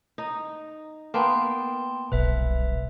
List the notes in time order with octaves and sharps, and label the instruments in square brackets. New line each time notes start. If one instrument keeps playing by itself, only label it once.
[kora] D#4
[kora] A#3 B3 [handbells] G5 A5 C6
[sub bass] D#1 [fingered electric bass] B1 [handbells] B4 E5